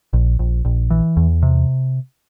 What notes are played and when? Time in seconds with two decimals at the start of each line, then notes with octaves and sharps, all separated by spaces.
0.13 A#1
0.39 A#1
0.65 A#1
0.90 E3
1.17 E2
1.43 C3